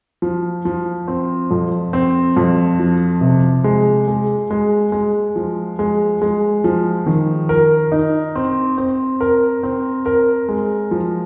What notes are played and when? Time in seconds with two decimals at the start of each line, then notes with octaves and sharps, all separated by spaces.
0.22 F3
0.65 F3
1.08 C4
1.51 F2
1.93 C4
2.37 F2
2.79 F3
3.21 C3
3.64 G#3
4.08 G#3
4.51 G#3
4.92 G#3
5.36 F3
5.79 G#3
6.22 G#3
6.64 F3
7.06 D#3
7.49 A#4
7.92 D#4
8.35 C4
8.78 C4
9.21 A#4
9.63 C4
10.06 A#4
10.49 G#3
10.91 F3